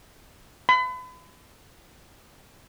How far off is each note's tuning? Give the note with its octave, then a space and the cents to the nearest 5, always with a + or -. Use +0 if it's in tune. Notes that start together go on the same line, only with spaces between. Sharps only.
B5 +35